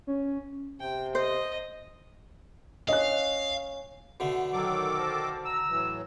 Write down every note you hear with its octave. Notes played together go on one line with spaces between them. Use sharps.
C#4
C3 G5
C5 D#5
C#4 D#5 F5 F#6
B2 D3 A3
D#3 F#3 A4 D6
A#4 C5 A5
A#5 E6
A2 E3 F#3